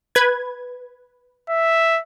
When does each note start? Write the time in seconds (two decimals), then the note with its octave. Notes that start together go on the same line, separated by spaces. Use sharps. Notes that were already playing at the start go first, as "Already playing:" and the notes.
0.15 B4 G#6
1.49 E5